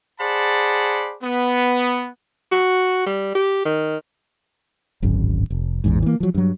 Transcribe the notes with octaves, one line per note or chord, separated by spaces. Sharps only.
G#4 C5 D5 F#5 A5 B5
B3
F#4
G3
G4
D#3
D1 G#1 F#2
F1
A1 E2 G#2
E3 A#3
F3 F#3
G2 F#3